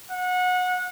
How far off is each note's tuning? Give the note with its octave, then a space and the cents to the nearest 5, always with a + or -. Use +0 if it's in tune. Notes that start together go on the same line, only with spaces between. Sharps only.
F#5 -25